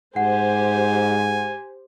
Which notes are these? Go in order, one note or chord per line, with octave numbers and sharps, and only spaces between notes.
G#2 G4 C5 F#5 G#5